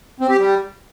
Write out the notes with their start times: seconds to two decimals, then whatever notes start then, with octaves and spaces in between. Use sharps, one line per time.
0.20 C4
0.29 G4
0.38 G3